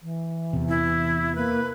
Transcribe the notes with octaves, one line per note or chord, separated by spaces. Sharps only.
E3
E2 C3
E4
A#3 B4